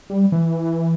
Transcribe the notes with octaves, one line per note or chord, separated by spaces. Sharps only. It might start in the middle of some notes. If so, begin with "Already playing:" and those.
G3
E3